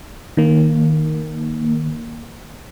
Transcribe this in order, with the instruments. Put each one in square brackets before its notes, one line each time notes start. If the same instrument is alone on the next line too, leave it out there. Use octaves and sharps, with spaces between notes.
[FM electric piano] D#3 A#3